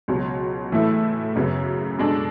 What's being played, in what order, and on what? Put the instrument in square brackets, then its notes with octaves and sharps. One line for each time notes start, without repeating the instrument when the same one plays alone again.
[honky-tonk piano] C#2 B2 F#3
A2 E3 A3 E4 A4
F#2 C#3 F#3 B3
B2 G#3 D4 A4